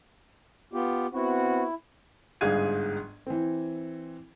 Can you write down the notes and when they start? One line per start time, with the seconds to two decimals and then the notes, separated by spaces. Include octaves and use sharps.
0.73 B3 F4 G4
1.14 B3 C4 E4 F#4
2.41 G1 G#2 G#4 F5 G#6 D#7
3.27 E3 C4